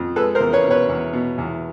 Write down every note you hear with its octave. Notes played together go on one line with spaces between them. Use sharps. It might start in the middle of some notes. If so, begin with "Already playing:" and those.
Already playing: F2
G#3 A4 B4
A#4 C5
E2
B4 C#5
B2
B4 C#5
E2
B2
E2